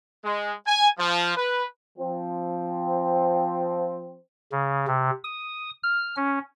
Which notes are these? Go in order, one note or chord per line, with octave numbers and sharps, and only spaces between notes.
G#3
G#5
F3
B4
F3 C4
C#3
C3
D#6
F6
C#4